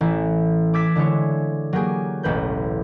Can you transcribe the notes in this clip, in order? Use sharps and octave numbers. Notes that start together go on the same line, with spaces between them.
A1 E4
D6 E6 G#6 A6 B6
D3 G#3 E4 C#5
F#3 A#3 G4 G#4
E1 A1 B4 G6